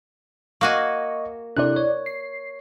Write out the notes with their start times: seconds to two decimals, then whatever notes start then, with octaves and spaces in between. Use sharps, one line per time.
0.61 A#3 F#4 D#5 G#5 C#6
1.57 C3 D4 E4 A4 D5 F#6
1.76 C#5
2.06 C7